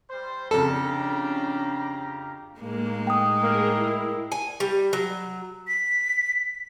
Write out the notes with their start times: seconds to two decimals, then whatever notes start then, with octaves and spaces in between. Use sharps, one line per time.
0.10 G3 C5
0.51 F2 C#3 C#4 D4 G4 A4 F5 A#5
2.60 A2 G#3 A#3 D#4
3.07 G5 D#6
3.43 A#3 G#4 A#4
3.81 E4
4.32 G#5
4.60 G3
4.93 F#3
5.67 B6